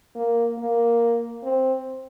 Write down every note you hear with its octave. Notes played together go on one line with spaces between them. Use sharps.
A#3
A#3
C4